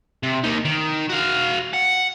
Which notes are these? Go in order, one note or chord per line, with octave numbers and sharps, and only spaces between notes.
C3
A#3 D#4
D#3
F#4 F5
F#5